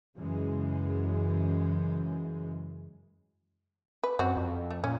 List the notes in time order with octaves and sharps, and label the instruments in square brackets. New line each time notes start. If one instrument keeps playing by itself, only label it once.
[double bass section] F#2 C#3 E3 G#3
[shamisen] B4
[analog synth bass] F#2 [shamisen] C4 F#4
[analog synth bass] F2
[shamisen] A3
[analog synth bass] A#2 [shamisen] C#4